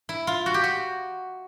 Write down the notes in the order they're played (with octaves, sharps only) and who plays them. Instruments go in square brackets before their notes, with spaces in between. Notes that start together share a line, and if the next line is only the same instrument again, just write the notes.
[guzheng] E4
F4
F#4
G4
F#4